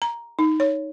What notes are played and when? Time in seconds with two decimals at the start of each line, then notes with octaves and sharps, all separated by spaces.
0.02 A#5
0.39 D#4
0.60 C#5